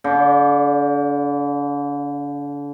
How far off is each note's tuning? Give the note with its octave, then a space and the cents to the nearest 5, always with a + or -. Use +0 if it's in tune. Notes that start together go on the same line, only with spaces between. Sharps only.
D3 -40 D5 +0